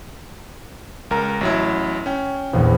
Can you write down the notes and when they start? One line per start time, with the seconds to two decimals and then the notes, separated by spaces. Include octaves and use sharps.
1.11 C#2 A#4 A#5
1.41 A1 F#3 E4
2.06 C#4 G5
2.53 A#1 E2